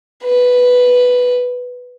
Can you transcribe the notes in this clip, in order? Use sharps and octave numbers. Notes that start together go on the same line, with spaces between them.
B4